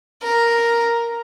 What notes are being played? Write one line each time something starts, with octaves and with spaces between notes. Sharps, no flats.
A#4